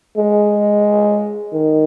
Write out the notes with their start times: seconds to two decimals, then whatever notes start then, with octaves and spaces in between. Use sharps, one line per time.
0.17 G#3
1.52 D#3